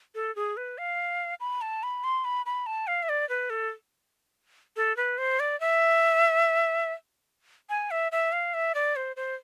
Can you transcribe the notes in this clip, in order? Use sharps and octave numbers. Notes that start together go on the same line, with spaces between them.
A4
G#4
B4
F5
B5
A5
B5
C6
B5
B5
A5
F5
E5
D5
B4
A4
A4
B4
C5
D5
E5
G#5
E5
E5
F5
E5
D5
C5
C5